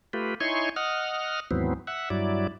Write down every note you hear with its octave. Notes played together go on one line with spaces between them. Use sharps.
A3 F4 G4 B4
D#4 E4 C#5 G#5 C6 C#6
D#5 F#5 F6
D#2 G#2 E3 F#3 B3 C4
E5 F#5
G2 F#3 E4 D5